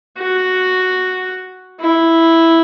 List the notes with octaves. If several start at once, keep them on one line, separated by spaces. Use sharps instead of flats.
F#4
E4